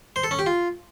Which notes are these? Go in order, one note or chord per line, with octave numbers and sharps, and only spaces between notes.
C5
A4
C#4
G4
F4